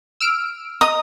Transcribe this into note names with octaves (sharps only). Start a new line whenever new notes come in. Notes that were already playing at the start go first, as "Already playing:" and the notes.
E6 F6 D7
D#5 A#5 D#6